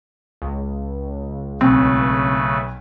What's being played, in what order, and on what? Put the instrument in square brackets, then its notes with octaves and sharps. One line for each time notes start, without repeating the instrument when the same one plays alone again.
[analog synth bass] C#2
[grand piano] B1 [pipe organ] C#3 A3 B4 [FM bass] C4